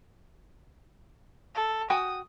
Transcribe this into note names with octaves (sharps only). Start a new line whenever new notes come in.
A4
F#4 G5 G#5 D#6